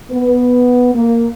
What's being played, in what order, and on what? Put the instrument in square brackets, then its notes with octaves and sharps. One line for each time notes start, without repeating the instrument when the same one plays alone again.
[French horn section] B3
A#3